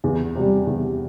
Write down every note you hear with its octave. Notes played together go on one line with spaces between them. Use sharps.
E2
C3 G3
E2